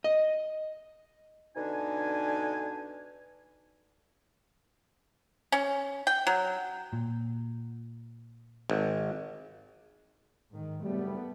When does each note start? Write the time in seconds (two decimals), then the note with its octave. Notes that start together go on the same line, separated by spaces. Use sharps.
0.04 D#5
1.56 B2 D3 D4 D#4 G#5
5.52 C#4
6.07 G5
6.27 F#3
6.93 A#2
8.70 G#1
10.53 G#2 D#3
10.84 F#1 G3 A3 B3